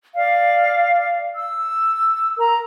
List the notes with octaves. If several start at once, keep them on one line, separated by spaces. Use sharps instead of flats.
D5 F5
E6
A#4 A#5